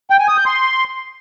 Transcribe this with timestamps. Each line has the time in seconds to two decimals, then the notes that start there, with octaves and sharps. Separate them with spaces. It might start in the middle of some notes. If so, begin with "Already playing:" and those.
0.10 G5
0.19 G#5
0.28 D#6
0.37 G6
0.46 C6